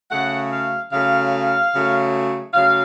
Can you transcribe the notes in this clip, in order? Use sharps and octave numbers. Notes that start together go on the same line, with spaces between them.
C#3 F#3 A3 F#5
F5
C#3 F#3 A3 F5
C#3 F#3 A3
C#3 F#3 A3 F5